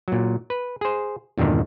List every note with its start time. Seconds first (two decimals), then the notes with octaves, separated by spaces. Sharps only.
0.08 A#2 F#3
0.50 B4
0.81 G#4 C5
1.38 E2 G2 A#2 D3 D#3